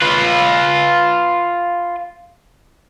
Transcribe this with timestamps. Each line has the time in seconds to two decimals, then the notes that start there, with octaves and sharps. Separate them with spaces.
0.02 F4 B4